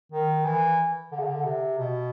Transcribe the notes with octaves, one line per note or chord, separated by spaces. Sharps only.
D#3
E3
D3
C#3
D3
C3
B2